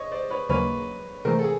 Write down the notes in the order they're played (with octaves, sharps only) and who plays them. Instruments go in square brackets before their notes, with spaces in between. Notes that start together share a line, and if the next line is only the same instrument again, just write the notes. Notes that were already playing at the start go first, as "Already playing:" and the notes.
Already playing: [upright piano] C#5 D#5
C5 D5
B4 C#5
[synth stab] D#2 C#3 F#3 A#3 [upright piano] B4 C#5
[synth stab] C3 E3 A3 [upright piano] A#4 C5
[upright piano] A4
G#4